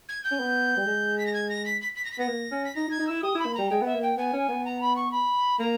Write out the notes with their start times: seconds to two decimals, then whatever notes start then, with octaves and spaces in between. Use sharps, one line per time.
0.09 G#6
0.24 G6
0.32 C#4
0.40 B3
0.77 G3
0.87 G#3
1.18 B6
1.26 A#6
1.34 G#6
1.49 A#6
1.65 B6
1.81 B6
1.95 B6
2.05 A#6
2.12 B6
2.19 B3 A#6
2.28 A#3
2.52 C#4
2.64 B6
2.75 D#4 A#6
2.88 D#4
2.91 G#6
2.99 D#4
3.07 E4 E6
3.22 G4 D#6
3.35 E4
3.39 B5
3.46 A#3
3.54 G3 A#5
3.70 G#3 G5
3.82 B3 E5
3.94 A#3
4.02 G5
4.18 B3 G#5
4.33 C#4
4.49 B3
4.65 A#5
4.81 B5
4.96 C#6
5.11 B5
5.59 A#3 A#5